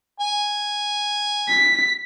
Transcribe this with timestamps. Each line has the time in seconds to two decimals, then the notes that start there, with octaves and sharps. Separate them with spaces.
0.20 G#5
1.48 B6